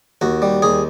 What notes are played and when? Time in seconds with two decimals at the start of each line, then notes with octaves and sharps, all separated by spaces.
0.21 D#2 F#4
0.42 G3
0.62 D#2 G#4